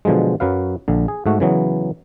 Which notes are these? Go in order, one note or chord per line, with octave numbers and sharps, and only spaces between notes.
B2 D3 F3 F#3 G#3
F#2 F#3 B4 F5
A#1 D3
G#4
G#2 A3 F#4
C#3 E3 F#3 B3